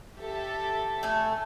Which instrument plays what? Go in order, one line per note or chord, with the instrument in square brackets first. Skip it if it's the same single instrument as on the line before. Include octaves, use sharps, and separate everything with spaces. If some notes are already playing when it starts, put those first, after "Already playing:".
[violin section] G4 A4 E5
[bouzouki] A3 G#5